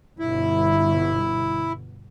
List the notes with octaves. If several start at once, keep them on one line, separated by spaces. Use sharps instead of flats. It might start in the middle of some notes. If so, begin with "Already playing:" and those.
G1 B2 E4